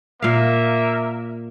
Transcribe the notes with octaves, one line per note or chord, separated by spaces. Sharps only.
A#2 A#3 A#4 E5 F5